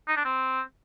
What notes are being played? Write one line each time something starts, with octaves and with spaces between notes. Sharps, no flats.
D#4
D4
C4